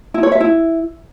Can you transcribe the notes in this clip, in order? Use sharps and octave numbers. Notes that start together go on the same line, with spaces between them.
E4
C#5
E5
E4